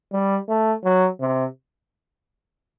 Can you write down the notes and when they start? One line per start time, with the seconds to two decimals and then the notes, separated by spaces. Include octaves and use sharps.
0.13 G3
0.49 A3
0.84 F#3
1.20 C3